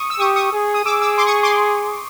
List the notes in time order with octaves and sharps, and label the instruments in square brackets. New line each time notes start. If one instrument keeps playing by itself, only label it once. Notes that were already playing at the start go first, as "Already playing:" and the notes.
Already playing: [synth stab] C#6 D#6
E6
[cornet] G4 [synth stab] C#6 D#6
[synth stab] C#6 D#6
[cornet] G#4
[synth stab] D#6
[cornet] G#4 [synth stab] D6 E6
[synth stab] D6 E6
C6 D6
C#6 D#6
C6 D6